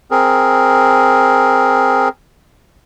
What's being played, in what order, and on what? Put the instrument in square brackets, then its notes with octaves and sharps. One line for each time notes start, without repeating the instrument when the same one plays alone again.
[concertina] C4 G#4 A#4